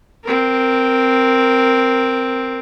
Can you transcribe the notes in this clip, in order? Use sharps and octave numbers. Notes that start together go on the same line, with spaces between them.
C4 A#4